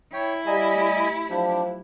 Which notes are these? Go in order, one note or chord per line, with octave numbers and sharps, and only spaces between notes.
E4 C#5 G5
G3 D#5 F#5 G#5 A#5 B5
A3 G4
F3 F#3 D4 G4